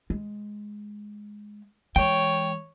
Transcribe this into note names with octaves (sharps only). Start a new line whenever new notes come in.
G#3
E3 G#3 C#5 G5